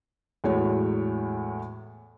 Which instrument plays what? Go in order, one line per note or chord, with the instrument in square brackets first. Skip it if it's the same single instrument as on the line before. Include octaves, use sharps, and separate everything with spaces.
[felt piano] E2 A2 G#3 F#4 C#5